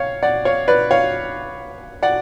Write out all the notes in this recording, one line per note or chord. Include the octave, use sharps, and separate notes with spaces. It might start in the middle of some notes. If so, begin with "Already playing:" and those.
Already playing: C#5 F5
D5 F#5
C#5 F5
B4 D5
C#5 F5
D5 F#5